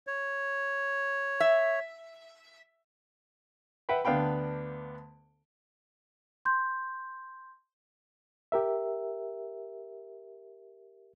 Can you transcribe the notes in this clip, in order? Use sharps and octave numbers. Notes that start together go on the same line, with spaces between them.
C#5
E5
B4 E5 F#5 G5 B5
D2 B3 D4 F5 G5 B5
C6 G6
G4 A#4 E5